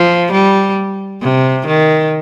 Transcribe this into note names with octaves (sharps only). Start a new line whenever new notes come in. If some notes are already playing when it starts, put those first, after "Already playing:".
Already playing: F3
G3
C3
D#3